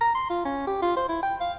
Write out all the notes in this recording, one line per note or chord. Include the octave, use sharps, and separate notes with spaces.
A#5
C6
F4
C#4
G4
F4
C5
E4
G5
F5